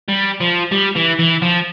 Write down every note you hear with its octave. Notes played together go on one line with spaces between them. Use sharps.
G3
F3
G3
E3
E3
F3